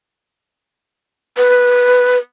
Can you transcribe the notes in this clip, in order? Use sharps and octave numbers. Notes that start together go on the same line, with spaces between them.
B4